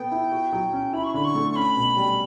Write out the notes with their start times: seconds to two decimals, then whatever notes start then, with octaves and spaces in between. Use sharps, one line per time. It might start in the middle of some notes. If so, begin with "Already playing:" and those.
Already playing: B3 A4 G5
0.12 E4
0.32 F#4
0.53 F#3
0.73 C#4
0.93 E4 B5
1.04 C#6
1.14 D3 B5
1.24 C#6
1.35 A3
1.52 C#6
1.56 C#4 B5
1.76 B2
1.97 G3